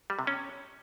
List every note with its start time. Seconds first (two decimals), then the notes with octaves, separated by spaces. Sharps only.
0.10 G3
0.19 C3
0.27 C#4